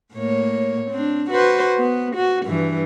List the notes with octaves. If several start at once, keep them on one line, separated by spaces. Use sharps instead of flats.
A2 A#3 C#5
C4 D4
F#4 B4 C5
B3
F#4
G2 E3